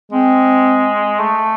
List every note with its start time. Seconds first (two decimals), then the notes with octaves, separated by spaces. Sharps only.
0.12 G#3 C4
1.20 A3